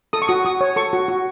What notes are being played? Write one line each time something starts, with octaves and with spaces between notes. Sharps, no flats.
A4 D#6
C#6
F#4 D#6
F#4 D#6
C#5
A4 C#6
F#4
F#4